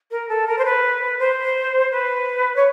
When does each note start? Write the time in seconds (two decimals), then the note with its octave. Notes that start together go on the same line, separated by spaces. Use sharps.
0.10 A#4
0.28 A4
0.47 A#4
0.58 C5
0.64 B4
1.19 C5
1.91 B4
2.56 C#5